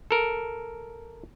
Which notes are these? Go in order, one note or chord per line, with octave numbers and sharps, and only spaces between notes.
A4 A#4